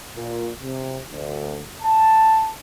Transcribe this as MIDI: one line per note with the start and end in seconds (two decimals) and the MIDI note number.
0.16 0.49 46
0.62 0.99 48
1.12 1.61 38
1.82 2.50 81